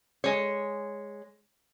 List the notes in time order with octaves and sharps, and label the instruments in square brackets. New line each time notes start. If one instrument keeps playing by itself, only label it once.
[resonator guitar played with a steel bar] G#3 C#5